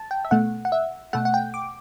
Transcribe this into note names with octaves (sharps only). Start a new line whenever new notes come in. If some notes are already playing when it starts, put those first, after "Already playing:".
Already playing: A5
G5
E5
B2 A3 F#5
F#5
E5
B2 A3 F#5
F#5
G5
D6